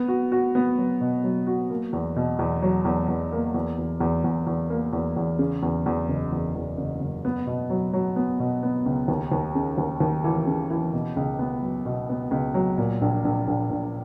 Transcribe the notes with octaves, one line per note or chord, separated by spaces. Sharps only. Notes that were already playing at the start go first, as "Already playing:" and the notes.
Already playing: B3
F#4
F#4
B3
F#3
B2
F#3
F#4
A#3
E2
B2
E2
F#3
E2
E2
A#3
E2
E2
E2
E2
E2
A#3
E2
E2
C#3
E2
E2
F#1
E2
E2
F#1
F#1
B3
B2
F#3
F#3
B3
B2
B3
C#2
D#2
D#2
C#3
D#2
D#2
E3
C#3
E3
B2
C#2
B3
F#3
B2
B3
C#2
F#3
A#2
A#1
A#1
A#1
A#1